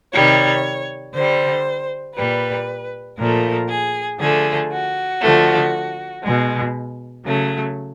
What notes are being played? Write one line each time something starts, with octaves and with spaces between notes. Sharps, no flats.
C3 D#3 G3 C#5
D3 G3 C5
A#2 G3 B4
A#2 F3 A3 A#4
G#4
D3 F3 A3 G#4
F#4
D3 F3 A3
B2 G#3
C#3 F#3 A3